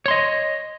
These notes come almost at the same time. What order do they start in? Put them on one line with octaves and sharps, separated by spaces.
C#5 C6 D#5